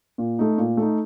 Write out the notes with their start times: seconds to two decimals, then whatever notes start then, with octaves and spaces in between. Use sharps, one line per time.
0.18 A#2
0.39 A3 D#4
0.58 A#2
0.77 A3 D#4